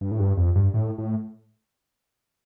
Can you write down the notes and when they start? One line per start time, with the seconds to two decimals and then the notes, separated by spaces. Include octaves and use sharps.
0.01 G2
0.11 A2
0.19 G2
0.37 F2
0.55 G2
0.74 A2
0.98 A2